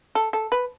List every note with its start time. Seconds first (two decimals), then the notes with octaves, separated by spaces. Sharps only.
0.15 A4
0.33 A4
0.52 B4